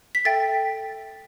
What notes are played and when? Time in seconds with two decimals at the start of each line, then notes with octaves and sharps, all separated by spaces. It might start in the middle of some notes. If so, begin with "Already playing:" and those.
0.15 B6
0.25 A4 E5 G5 A6